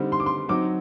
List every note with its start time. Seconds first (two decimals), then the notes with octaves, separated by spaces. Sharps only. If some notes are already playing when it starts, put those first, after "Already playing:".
Already playing: D3 G3 C4 D#4
0.12 C6
0.20 D6
0.26 C6
0.49 F#3 C4 D#4 D6